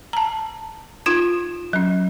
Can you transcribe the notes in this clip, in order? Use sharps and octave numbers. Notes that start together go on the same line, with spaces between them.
A5 A#5
D#4 F4 G#6
F#3 C#4